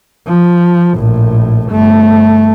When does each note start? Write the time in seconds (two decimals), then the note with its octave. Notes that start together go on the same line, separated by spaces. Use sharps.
0.27 F3
0.95 A#1 A2
1.69 G1 A3